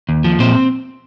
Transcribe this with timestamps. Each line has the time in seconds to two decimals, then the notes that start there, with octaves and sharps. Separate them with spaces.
0.09 D#2
0.24 F3
0.39 A#2 C4 C5